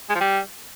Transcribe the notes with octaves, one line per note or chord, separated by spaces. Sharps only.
G#3
F3
G3